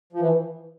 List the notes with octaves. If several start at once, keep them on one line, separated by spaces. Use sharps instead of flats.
F3
E3